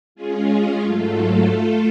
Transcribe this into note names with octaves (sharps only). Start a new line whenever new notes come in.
G#3 C#4 F4 G#4
G#2 F#3 A3 F4 A4
A3 F4 A4